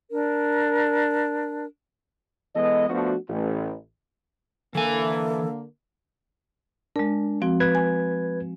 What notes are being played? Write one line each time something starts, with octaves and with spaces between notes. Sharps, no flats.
D4 A#4
E3 G#3 B3 A4 D#5
F3 A3 B3 D4 F#4
A1
D3 E3 A#3 A4 G#5
G#3 D4 A#4
F3 C4 F#4
B4 G#6
G#5